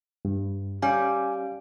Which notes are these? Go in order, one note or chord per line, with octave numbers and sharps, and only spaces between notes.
G2
G3 C#4 F5 G#5